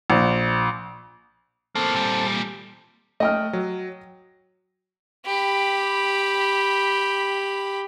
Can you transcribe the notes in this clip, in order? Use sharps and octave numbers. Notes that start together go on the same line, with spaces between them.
A#1
A2 A#3 C4 A4 A5
A#2 G3
A3 D#5 G5 F6
F#3
G4 B5